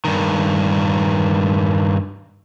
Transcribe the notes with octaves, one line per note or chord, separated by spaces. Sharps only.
G2 D#3